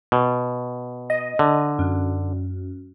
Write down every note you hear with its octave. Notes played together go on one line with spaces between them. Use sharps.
B2
D#5
D3
F#2